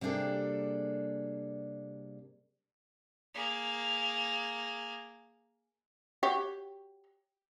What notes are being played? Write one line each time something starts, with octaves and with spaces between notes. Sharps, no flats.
C3 G3 A#3 D4 G#4 A4
A#3 G#4
F#4 G4 C#5